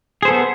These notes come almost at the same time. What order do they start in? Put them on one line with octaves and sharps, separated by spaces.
G#4 C5 A4 B3